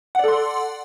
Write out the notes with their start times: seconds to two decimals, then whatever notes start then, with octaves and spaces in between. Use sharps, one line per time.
0.15 F#5
0.19 D5
0.24 A4
0.28 C6